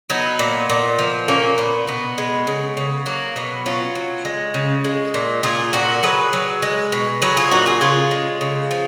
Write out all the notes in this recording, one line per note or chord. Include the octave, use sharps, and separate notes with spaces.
F#3 B3 D#4
A#2
A#2
F3
A#2 A#3 C#4
A#2 B3
B2 B3
G#3
C#3
C#3
F#3 A#3
B2 B3
F#3 C#4 F4
F#3
G#3
C#3
G#3
A#2
A#2 F4 G#4
A#2 F#4 A#4
F#3 G#4 B4
F#3
G#3
B2
F#3 G#4 B4
F4 G#4
A#2 D#4 F#4
F4 G#4
C#3 F4 G#4
G#3
C#3
F3